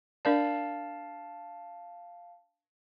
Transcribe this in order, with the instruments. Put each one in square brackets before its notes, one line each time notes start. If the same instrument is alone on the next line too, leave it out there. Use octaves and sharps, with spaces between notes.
[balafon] D4 A#4 D5 [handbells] F5 A5